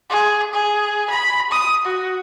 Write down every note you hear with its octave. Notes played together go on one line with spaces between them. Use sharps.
G#4
G#4
B5
D#6
F#4